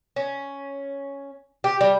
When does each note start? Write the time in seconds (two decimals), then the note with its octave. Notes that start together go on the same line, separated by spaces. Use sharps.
0.16 C#4
1.64 G4
1.81 G3